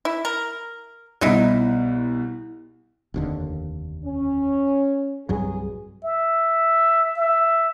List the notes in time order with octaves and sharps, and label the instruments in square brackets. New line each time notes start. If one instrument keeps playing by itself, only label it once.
[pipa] E4
A#4
[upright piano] C2 B2 [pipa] F#3 D#4 E4
[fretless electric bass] F1 D#2 D3
[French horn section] C#4
[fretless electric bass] C2 G2 F#3 [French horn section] G#4
[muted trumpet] E5
E5